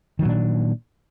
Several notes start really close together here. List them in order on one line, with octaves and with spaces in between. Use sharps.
D#3 F#3 A#2 D4